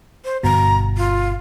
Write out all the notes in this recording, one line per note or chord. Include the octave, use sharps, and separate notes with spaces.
C5
G1 B2 A#5
F4